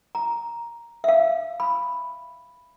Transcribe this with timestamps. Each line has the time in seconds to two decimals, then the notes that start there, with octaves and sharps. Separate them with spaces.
0.15 A#5
1.04 E5 F5
1.60 B5